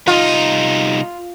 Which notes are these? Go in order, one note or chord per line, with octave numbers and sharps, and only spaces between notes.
C2 D#4 F4